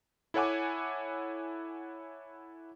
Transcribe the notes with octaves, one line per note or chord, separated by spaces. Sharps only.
E4 A4 C#5 F#5 G#5 D6